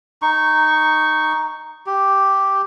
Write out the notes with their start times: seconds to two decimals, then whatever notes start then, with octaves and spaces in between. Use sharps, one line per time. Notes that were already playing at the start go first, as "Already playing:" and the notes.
0.22 D#4 C#6
1.86 G4